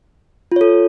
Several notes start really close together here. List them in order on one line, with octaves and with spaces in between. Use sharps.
F4 C#5 A4